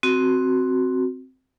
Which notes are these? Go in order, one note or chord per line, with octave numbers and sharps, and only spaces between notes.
C4 F#4